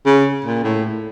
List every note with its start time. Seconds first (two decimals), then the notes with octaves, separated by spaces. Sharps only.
0.06 C#3
0.45 A#2
0.64 A2